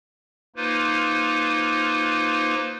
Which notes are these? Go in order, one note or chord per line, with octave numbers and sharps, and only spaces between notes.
A#3 D#4 F4 B4 C5